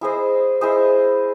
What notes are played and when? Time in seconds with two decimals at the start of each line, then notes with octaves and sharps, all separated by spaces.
0.01 E4 G#4 C5 D#5
0.61 E4 G#4 C5 D#5